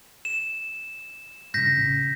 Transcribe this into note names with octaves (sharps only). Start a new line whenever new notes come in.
E7
G2 C#3 G6 A#6 B6
A1 C#3